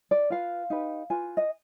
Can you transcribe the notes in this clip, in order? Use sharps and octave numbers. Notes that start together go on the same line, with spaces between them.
D5
F4 B4 F5
D#4 G4 B4
F4 B4 G#5
D#5